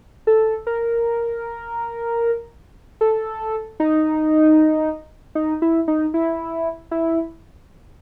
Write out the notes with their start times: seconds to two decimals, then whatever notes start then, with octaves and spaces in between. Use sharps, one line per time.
0.27 A4
0.67 A#4
3.01 A4
3.80 D#4
5.35 D#4
5.62 E4
5.88 D#4
6.14 E4
6.91 E4